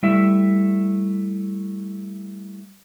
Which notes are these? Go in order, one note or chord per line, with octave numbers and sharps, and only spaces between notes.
G3 A3 E4 E5